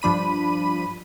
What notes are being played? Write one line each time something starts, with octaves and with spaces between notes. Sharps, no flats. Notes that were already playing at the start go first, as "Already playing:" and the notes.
G2 F3 D4 B5 D#7